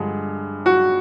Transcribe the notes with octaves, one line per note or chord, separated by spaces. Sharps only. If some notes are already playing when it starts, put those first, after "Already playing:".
Already playing: G2 D3 F3 G#3
F#4